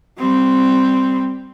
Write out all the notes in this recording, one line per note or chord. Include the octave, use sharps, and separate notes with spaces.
G3 C4